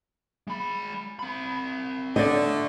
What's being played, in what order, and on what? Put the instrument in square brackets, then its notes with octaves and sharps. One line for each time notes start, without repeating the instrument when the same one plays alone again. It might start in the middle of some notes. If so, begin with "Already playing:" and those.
[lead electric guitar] G#3 B5
C4 B5
[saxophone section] D3 A3 [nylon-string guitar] D5 D#5